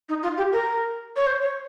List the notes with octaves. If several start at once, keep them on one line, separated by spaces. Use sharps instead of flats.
D#4
F4
G4
A#4
C#5
C5
C#5